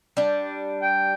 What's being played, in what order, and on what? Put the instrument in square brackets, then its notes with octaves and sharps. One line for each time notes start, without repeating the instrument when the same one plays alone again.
[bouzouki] G3 D4
[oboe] G5